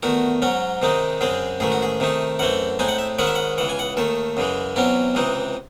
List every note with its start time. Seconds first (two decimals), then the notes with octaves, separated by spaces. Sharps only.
0.03 E2 D#3 A3 F#4
0.42 G#2 F#3 C#4 F#4
0.82 C3 D#3 G#3 C4 D#4
1.21 F#2 C#3 G#3 C4 G#4
1.60 A1 G#2 D#3 A3 G#4
1.72 F#4
1.82 G#4
2.00 C3 D#3 A3 D#4
2.39 F#2 E3 A3 C4 F#5
2.79 A2 G#3 C4 D#4 G#5
2.88 F#5
2.99 E5
3.18 G#2 D#3 G#3 C#4 E4 F#5
3.27 E5
3.35 F#5
3.58 C#2 C#3 E3 F#5
3.69 G#5
3.79 F#5
3.97 D#2 D#3 A3 A4
4.37 F#2 C#3 E3 G#3
4.76 E2 C3 F#3 C#4 E4
5.15 C#2 C3 E3 G#3 D#4